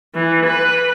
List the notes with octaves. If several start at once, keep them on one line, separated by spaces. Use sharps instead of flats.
E3
B4